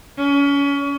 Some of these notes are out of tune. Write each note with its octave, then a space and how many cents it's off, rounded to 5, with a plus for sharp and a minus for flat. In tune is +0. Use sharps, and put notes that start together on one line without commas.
C#4 +30